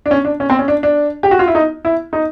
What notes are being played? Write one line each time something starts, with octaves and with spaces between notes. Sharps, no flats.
D4
C#4
D4
C#4
C4
C#4
D4
D4
G4
F#4
F4
E4
D#4
E4
D#4